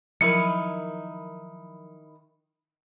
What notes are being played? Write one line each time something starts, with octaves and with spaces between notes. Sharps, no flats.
D#3 F3 F#3 D#4 E4 A#4 C#7